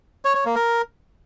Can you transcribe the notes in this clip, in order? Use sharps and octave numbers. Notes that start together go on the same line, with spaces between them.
C#5
C#5
A#3
A#4